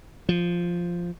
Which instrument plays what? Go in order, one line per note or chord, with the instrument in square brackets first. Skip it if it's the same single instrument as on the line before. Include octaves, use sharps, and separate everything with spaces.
[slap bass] F3